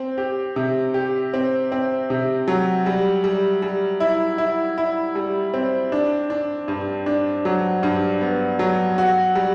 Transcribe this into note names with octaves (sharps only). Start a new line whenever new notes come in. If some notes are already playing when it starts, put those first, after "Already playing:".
Already playing: C4
G4
C3
G4
C4
C4
C3
F#3
G3
G3
G3
E4
E4
E4
G3
C4
D4
D4
G2
D4
F#3
G2
B3
F#3
F#4
G3